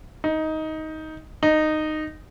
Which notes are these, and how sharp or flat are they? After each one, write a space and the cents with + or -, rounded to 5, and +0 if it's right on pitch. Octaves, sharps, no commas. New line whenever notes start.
D#4 +15
D#4 -10